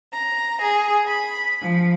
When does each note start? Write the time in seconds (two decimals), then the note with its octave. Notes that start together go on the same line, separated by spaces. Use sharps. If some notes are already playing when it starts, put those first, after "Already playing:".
0.13 A#5
0.61 G#4
1.07 B5
1.60 F3